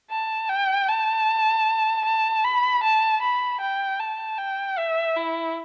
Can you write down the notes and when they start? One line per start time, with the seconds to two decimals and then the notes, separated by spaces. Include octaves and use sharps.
0.10 A5
0.49 G5
0.88 A5
2.05 A5
2.44 B5
2.83 A5
3.22 B5
3.61 G5
4.00 A5
4.38 G5
4.78 E5
5.17 E4